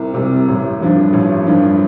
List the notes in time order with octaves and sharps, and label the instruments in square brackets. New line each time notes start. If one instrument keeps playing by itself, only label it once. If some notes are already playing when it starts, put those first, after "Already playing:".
Already playing: [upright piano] C2 C3 G3
C3 G3
A1
G2 F3 D4
A1
G2 F3 D4